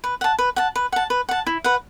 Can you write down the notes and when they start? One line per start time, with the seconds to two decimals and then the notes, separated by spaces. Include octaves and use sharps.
0.04 B4
0.21 F#5 A5
0.39 B4
0.56 F#5 A5
0.76 B4
0.92 F#5 A5
1.10 B4
1.29 F#5 A5
1.47 E4
1.64 B4 F#5